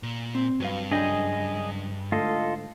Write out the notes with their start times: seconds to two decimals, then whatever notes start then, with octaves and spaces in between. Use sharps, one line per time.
0.03 A#2
0.35 C4
0.60 G2 F#3 B4 F5
0.92 C#2 F#2 D4 G#4 D#5 G5 G#5
2.12 G#2 D3 A3 F4 A4 D#5